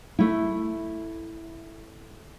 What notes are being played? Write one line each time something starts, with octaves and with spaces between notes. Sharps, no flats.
A3 E4